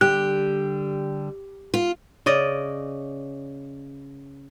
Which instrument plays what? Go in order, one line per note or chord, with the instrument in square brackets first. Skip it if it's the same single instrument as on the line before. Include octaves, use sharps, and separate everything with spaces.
[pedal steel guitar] D3 G3 F#6 [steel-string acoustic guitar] G4
[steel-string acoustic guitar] F4
[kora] C#3 D5 D#5